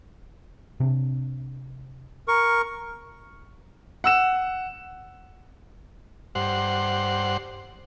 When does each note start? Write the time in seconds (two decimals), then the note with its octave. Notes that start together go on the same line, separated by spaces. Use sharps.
0.80 C3 D4
2.28 A#4 C#6
4.04 F#5 E6 E7
6.35 G2 C5 F#5